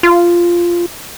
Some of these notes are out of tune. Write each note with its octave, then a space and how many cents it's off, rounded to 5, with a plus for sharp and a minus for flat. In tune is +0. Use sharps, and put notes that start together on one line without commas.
F4 -10